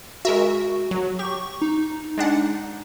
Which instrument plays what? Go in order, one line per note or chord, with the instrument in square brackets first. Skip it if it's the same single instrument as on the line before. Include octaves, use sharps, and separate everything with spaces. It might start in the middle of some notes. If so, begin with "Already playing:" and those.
[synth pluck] G#3 A#4 E5 [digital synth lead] F#4
[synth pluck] F#3
[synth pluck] G4 [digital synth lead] C#6
[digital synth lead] D#4
[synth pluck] G#3 D4 F#5